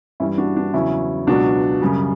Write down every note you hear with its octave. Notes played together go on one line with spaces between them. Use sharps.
G2 E3 G3 C#4 E4
D4 F#4
D4
E2 C#3 F#3 C#4 E4
C#2 B2 F#3 D4 F#4
F#2 C#3 G3